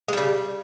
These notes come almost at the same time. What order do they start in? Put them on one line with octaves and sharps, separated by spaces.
G#3 G3 C#3